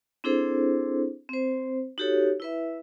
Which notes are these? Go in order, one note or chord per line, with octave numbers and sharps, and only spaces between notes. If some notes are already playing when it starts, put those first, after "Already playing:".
C4 D4 E4 G#4 A4 C5
C4 C5
D#4 F#4 G4 A4 C#5
E4 B4 E5